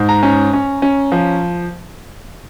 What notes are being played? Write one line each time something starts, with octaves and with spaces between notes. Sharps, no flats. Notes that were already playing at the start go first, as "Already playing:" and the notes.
Already playing: G#2
A#5
C#4
C#4
C#4
F3